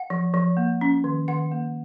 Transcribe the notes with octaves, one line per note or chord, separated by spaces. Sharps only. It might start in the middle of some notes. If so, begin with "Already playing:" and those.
Already playing: F#5
F3
F3
A#3
C#4
D#3
D#3 F#5
A#3